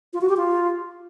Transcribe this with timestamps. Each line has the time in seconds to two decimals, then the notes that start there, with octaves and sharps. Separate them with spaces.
0.13 F4
0.21 F#4
0.29 G4
0.37 F4